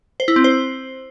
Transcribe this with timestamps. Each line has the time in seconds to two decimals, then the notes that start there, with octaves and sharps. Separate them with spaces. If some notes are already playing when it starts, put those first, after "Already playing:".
0.20 C5
0.28 E4
0.36 C4
0.44 C5